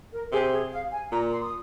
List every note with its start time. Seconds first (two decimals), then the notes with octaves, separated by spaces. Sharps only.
0.12 A#4
0.32 C3 G#4
0.52 G#4
0.72 F5
0.92 G#5
1.12 A#2 A#5
1.31 C6
1.42 D#6